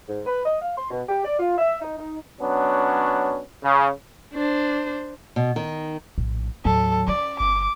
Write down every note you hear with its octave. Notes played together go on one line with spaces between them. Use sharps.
G#2
B4
D#5
F5
C6
B2
G4
D5
F4
E5
D#4
D#4
F#3 B3 C#4 D4
C#3
D4 C5
B2
D#3
A#1 A2
D#2 A2 F#3 A4
C#4 D5
G1 D6